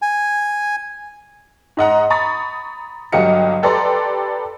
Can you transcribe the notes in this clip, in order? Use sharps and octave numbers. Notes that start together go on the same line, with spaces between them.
G#5
G#2 D#5 F#5 A#5
A#5 B5 C#6 D#6 A6
G1 F#3 G4 D#5 F5 C#7
G4 A4 B4 D5 A#5 C6